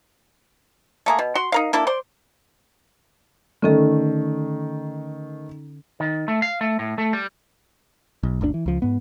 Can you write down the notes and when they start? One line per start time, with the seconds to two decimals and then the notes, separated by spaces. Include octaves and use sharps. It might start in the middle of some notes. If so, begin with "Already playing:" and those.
1.06 A3 A#3 G#4
1.19 B2
1.35 F#4 C6
1.52 D#4 A#4 F5
1.73 A#3 D4 E4 A4
1.87 C5 D5 C6
3.62 D3 D#3 A3 C#4 A4
6.00 D#3
6.28 A3
6.42 F5
6.61 A3
6.79 A2
6.98 A3
7.13 G3
8.23 B1
8.41 G1 D2 C3 D4
8.54 E3
8.66 C#2 F3
8.82 G#2 B3